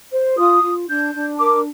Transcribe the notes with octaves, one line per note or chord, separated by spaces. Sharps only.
C5
F4 D#6
F4
D4 G6
D4
A#4 D6